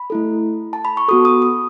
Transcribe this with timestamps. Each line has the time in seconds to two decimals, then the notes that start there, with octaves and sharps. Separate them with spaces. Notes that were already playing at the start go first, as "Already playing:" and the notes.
Already playing: B5
0.10 A3 E4 A4
0.73 A5
0.85 B5
0.97 C#6
1.08 B3 F#4 A4 D#6
1.25 D#6
1.42 D#6